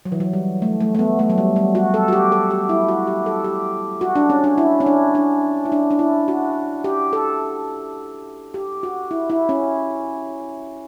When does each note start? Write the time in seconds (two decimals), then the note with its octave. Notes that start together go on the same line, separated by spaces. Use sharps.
0.05 F#3
0.12 E3
0.20 F#3
0.33 G3
0.62 A3
0.80 A3
0.95 A3
0.99 B3
1.19 A3
1.30 F#3
1.38 G3
1.56 G3
1.75 F#4
1.94 A4
2.08 F#4
2.13 G4
2.32 A4
2.50 G4
2.69 E4
2.88 F#4
3.07 G4
3.26 A4
3.44 G4
4.01 F#4
4.16 D4
4.30 C#4
4.44 D4
4.58 E4
4.80 C#4
4.86 D4
5.15 D4
5.65 E4
5.72 D4
5.91 D4
5.99 E4
6.28 F#4
6.84 G4
7.13 A4
8.54 G4
8.83 F#4
9.11 E4
9.30 E4
9.49 C#4